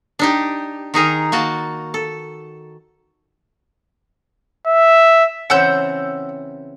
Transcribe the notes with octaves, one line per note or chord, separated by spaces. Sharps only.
D4 D#4 G4
D#3 D#4 G#4 A#4
A#3 F#4 A5
A4
E5
C#3 E3 C4 F#5 E6 G6